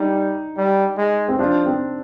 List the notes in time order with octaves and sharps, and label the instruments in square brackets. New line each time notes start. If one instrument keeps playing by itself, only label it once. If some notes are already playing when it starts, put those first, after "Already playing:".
Already playing: [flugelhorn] G3 [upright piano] D#4
[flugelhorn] G3
G#3
[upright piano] C4
[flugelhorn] F3 [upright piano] D4
[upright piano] C4